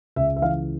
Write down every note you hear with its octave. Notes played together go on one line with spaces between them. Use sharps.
C#2 E5
E5
E3 F5